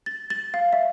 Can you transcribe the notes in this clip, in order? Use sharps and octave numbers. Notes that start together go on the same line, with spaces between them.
A6
A6
F5
E5